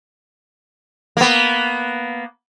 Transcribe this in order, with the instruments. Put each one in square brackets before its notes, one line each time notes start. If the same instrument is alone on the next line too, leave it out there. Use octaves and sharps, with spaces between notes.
[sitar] A#3 B3